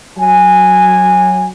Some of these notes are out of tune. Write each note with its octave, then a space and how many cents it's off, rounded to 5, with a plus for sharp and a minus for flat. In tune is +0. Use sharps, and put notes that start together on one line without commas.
F#3 +0 G#5 -10